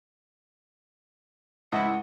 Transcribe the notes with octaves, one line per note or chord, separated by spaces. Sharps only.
C#2 G#2 E4 D#5 F#5